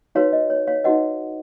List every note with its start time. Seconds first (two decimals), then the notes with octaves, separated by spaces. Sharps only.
0.15 D#4 F#4 B4 C#5 F5
0.33 D#5
0.50 C#5
0.67 C#5 F5
0.84 D#4 F#4 B4 D#5 F#5